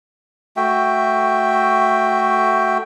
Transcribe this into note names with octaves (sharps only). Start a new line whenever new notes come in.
A3 F#4 E5 G5